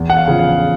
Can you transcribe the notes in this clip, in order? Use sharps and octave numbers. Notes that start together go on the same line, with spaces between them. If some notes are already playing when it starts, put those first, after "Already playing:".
Already playing: E2
F#5
F5
C#3 F3
F5